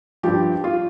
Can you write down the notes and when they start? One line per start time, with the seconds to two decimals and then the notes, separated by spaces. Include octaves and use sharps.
0.23 G2 F3 G4
0.64 F4